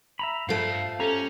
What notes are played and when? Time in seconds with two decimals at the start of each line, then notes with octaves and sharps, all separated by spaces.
0.19 E5 A#5 B5
0.49 G2 F3 A3 F5
1.00 C#4 G4 A4 A#5